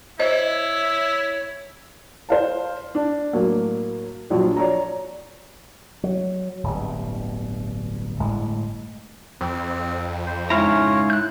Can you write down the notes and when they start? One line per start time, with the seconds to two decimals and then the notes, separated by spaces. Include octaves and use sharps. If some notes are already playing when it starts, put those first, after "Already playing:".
0.19 E4 C5 C#5 D#5 E5
2.29 C5 F5 A5
2.95 D4
3.33 A2 F#3 A#3
4.30 A#1 F3 F#3
4.56 C#5 D5 A#5
6.04 F#3
6.63 D1 G1 G2
8.19 G1 A2 G#3
9.41 F2 C4
10.27 C5
10.50 G#2 C#3 E4 F4 C#5 F5 A#5
11.10 F#6 G6